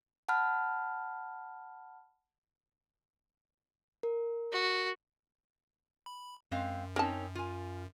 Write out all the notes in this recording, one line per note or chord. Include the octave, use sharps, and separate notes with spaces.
F#5 A5 B5 F6
A#4
F#4
B5
F#2 G#3 C4 F5
C4 C#4 D#4 A#4 A5
F4 G#5